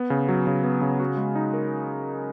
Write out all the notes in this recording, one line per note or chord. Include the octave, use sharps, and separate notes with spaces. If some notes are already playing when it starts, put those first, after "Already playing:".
Already playing: B3
C#3
F#3
C#3
B3
C#3
F#4
G#3
D#4
A#4